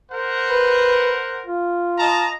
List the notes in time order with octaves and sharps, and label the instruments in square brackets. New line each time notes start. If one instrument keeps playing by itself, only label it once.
[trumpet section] A#4 C5 F#5
[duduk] B4
F4
[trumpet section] D#5 A5 A#5